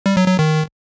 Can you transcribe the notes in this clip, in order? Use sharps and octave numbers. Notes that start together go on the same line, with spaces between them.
G3
F#3
F#3
D#3